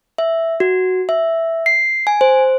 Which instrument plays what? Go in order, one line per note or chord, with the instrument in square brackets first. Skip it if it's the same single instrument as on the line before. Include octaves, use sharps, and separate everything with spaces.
[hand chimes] E5
F#4
E5
C7
G#5
C5